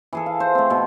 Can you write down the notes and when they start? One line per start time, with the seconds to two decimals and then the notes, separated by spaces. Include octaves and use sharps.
0.13 E3 G#4 A4
0.26 F5
0.40 C5
0.55 A3 C4
0.70 B2